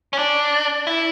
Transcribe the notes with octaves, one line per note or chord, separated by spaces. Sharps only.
C#4
D4
E4